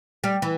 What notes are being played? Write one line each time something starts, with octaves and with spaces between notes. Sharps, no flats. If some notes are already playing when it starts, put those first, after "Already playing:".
G3
E3